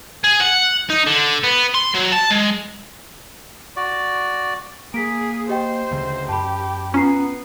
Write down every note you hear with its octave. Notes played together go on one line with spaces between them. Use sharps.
G#4
F#5
D#4
D3
B3
C6
F#3
A5
G#3
F#4 D5
A#3 G#4 B6 D7
G4 C5 D#5 G5
D2 C#3
F#2 G4 A5 B5
B3 C#4 F4 A#5 C7